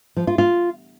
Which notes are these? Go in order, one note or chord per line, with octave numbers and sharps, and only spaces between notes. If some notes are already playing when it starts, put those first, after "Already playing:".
F3
F4
F4